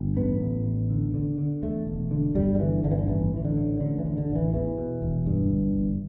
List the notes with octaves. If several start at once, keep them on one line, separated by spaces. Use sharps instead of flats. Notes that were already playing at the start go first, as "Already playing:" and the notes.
Already playing: G1
A1 B3
A2
A1
D3
D3
D3
E2 A3
E1
D3
G1 G3
G3
D3 E3
G1 D3
E3
D3
A1 E3
A1 E3
D3
A2
A1 D3
E3
D3
D3
A1
E3
E2 E3
B2
E1
G2
G1
G1